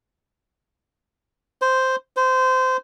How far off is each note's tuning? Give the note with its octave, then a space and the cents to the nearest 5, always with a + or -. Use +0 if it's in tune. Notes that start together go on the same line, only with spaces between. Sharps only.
C5 -5
C5 -20